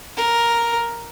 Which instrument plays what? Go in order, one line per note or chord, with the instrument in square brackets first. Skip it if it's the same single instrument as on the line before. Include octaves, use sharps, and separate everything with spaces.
[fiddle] A#4